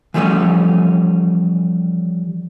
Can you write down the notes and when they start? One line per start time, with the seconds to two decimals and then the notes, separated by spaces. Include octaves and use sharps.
0.14 E3 F3 G3 A3 C#4